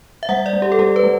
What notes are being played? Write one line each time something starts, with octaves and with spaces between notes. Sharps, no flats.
E5
G3 F#5
D5
G3
G4
A4
G3 G4
B4
G3